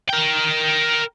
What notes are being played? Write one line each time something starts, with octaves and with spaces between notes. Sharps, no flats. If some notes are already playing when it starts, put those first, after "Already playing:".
A#4 G5